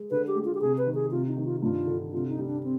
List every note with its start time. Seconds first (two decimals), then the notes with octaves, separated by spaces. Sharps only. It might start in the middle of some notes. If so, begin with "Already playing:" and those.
Already playing: G#3
0.11 D3 B4
0.27 G4
0.35 G#3
0.45 F4
0.55 G4
0.61 C3 G#4
0.78 B4
0.86 D#3
0.94 G#4
1.11 C3 F4
1.28 D#4
1.37 D#3
1.45 F4
1.62 G2 F4
1.86 D3
2.12 C3 F4
2.29 D#4
2.38 G3
2.46 D4
2.63 C4